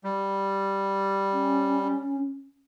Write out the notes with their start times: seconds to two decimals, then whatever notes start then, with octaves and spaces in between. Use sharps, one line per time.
0.04 G3
1.33 C#4